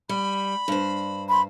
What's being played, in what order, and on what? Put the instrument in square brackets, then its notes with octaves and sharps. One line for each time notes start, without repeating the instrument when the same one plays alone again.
[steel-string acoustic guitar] G3 [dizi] B5
[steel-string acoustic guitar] G2 C5
[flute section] B5 C6